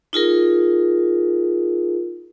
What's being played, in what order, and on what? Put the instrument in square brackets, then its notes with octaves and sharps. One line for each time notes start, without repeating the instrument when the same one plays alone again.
[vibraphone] D#4 F4 G#4 A#4